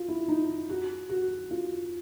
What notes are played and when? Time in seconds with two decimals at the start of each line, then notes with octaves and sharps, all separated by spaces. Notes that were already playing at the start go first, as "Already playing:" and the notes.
Already playing: F4 F#4
0.08 E4
0.28 D#4
0.69 F#4
1.09 F#4
1.51 F4